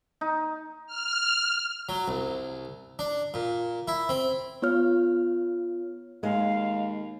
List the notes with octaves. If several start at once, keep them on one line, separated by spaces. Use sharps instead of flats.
D#4
F6
F#3
C2
D4
A#2
E4
C4
B3 F4 C#5 F6
D#2 G#3 F5